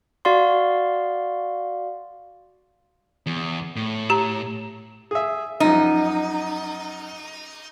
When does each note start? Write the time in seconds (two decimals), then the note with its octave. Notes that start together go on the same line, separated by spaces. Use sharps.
0.25 F#4 D5 F5 C6
3.26 E2
3.76 A2
4.10 G4 A#5
5.11 G#4 E5
5.60 F#2 F3 D#4